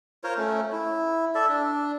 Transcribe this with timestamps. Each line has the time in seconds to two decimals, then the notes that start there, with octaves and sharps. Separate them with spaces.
0.24 F4 A#4 C5 C#5
0.37 A3 C#4
0.72 E4
1.35 A4 D5 E5
1.49 D4